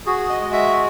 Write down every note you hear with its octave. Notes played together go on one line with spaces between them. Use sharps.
F#4 G#4
D#5
G#3
E5